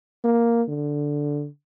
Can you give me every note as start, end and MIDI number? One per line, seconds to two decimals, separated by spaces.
0.24 0.63 58
0.69 1.47 50